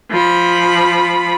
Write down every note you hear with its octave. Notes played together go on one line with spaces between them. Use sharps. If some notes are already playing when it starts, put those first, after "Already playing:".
F3 B5